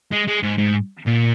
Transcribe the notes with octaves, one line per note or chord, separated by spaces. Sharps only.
G#3
G#3
G#2
G#2
A#2